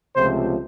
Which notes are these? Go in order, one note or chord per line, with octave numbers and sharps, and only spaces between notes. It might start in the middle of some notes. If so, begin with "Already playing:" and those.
C#2 C3 F3 A3 C5